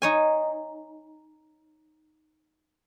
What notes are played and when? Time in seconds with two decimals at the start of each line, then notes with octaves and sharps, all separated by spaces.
0.02 D#4 C#5 G#5